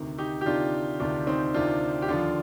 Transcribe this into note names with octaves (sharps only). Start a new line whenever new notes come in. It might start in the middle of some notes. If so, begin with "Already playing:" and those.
Already playing: D2 C3 D#3
D#4 G4
G4
D2 C3 D#3 D4 F4
D2 C3 D#3 D4 F4
C4 D#4
D2 C3 D#3 D4 F4
G4
D#2 D3 F3 D4 F4